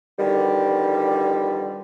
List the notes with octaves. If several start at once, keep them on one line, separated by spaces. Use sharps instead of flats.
B2 D3 D#3 F3 G3